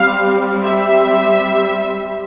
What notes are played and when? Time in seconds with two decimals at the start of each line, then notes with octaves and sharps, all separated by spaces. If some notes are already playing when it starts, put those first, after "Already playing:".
Already playing: G3 C4 F5
0.64 E5